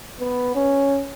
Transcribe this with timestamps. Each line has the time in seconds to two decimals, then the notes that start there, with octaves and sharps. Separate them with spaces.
0.20 B3
0.55 C#4